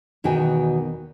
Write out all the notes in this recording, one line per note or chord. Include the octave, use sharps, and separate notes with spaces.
E2 B2 D#3 F#4 G5 G#5